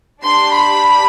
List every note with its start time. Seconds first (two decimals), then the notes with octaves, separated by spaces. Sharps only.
0.22 D4 G4 C6
0.51 B5